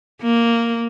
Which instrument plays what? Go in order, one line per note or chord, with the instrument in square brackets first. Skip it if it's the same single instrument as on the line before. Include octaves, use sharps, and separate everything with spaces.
[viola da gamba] A#3